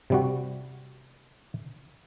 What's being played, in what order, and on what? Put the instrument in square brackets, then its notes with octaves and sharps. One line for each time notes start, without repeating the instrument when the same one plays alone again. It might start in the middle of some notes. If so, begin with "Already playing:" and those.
[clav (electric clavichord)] C3 G3 F#4